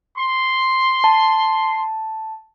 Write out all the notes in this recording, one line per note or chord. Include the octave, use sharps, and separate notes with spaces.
C6
A5